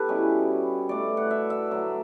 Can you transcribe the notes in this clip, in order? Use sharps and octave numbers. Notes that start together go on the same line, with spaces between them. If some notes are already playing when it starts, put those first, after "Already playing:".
Already playing: B3 G4 A4 B4
B2 G3 C#4 E4
B2 A3 D4 D5
F#5
E5
E5
D3 F#3 A3 D5